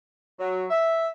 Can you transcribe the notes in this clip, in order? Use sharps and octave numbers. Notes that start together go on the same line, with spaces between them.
F#3
E5